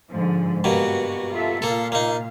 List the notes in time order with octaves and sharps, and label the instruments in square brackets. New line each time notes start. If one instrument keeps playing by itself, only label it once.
[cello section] G#2 D3 F3
[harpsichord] G2 B2 A#3 [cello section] F#4
[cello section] F4 A4 E5
[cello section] A#2 F5 [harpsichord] A#3 A4
[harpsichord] A#3 D#4